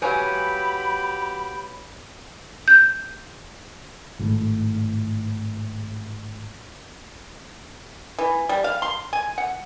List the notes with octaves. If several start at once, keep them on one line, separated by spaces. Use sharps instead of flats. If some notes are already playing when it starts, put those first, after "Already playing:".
F#3 G4 B4 C#5 F5 G#5 B5
G6
G#1 A2
E3
G3
F5
C6
G#5
F#5